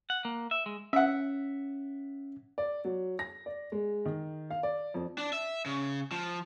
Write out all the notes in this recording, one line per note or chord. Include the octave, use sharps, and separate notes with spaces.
F#5
A#3
E5
G#3
C#4 E5 F#5
D5
F#3
A#6
D5
G#3
D#3
F5
D5
F2
D4
E5
C#3
F3